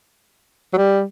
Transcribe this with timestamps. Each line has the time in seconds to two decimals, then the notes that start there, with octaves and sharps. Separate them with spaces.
0.73 F#3
0.77 G3